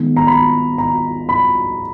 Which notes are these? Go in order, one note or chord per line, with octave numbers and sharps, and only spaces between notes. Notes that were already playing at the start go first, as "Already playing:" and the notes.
Already playing: D#3 G#3 B3
A#5
B5
A#5
B5